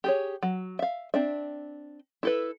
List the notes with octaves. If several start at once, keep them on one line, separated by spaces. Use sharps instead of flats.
G4 G#4 C#5
F#3
E5 F5
C4 D4 E5
E4 A4 B4